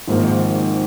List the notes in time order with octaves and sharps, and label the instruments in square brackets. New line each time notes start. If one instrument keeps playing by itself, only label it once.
[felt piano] G#1 G#2 F3 A#3